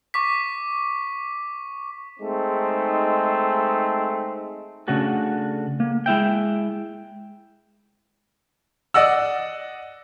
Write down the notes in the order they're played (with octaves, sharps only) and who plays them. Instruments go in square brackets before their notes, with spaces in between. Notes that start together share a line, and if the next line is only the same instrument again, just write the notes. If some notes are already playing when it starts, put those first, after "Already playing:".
[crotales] C#6 D6 B6
[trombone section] G#3 A3 C4 D#4
[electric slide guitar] C#3 A3 D4 F#4 A4
A#3
G#3 E4 E5 G5
[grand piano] D5 D#5 F#5 E6